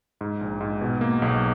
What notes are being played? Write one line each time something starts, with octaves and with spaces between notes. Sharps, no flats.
G#2
A#1
G#2
B2
A#3
B1